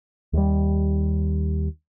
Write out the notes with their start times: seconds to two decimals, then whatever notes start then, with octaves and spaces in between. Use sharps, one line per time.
0.33 D#2 G3